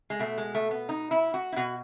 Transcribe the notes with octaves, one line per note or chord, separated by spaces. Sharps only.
G#3
B2 A3
G#3
A3
B3
D#4
E4
F#4
E4
B2 F#4